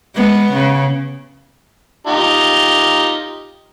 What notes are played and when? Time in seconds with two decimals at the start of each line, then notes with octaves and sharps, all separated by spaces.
0.15 G#3 B3
0.53 C#3
2.07 D#4 F4 G4